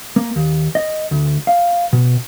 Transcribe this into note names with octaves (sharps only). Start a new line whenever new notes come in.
A#3
D#2
D#5
D2
F5
B2